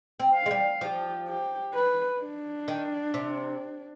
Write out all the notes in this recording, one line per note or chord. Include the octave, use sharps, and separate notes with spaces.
C4
F5
G#3
G3
F3 G4
G4
B4
D4
D#3
C3